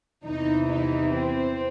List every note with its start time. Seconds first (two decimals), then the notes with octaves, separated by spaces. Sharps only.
0.25 E2 C3 E3 D#4
0.69 D#4
1.14 C4